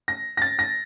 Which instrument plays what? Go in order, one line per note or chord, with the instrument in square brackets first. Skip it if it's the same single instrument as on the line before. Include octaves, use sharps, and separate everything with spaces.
[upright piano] A#6
A#6
A6
A#6